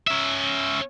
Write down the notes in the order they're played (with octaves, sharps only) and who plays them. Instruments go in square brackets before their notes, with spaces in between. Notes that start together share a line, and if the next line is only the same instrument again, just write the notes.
[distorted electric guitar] C#4 E5